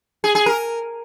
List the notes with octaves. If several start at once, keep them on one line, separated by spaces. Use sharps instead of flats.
G#4
G#4
A#4